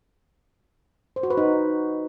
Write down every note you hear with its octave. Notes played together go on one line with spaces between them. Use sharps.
C5
F#4
B4
D#4